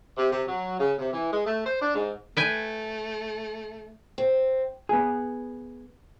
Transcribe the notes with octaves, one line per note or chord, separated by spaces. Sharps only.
C3
C3
F#3
C#3
C3
E3
G#3
A3
C5
D4
G#2
A3 B4 G5 G#5
C4
B3 G#4